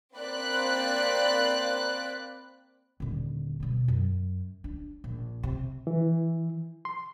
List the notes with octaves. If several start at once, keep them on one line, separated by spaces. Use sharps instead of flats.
A#3 C4 D5 B5 F#6
D#1 D3
B2 G3
F#2
D4
A#1
C3
E3
C6